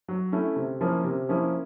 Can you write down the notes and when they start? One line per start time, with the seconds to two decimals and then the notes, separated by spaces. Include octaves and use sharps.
0.08 F#3
0.32 A3 C#4 E4
0.56 C3
0.81 F3 A#3 C#4 E4
1.04 C3
1.29 F3 A#3 C#4 E4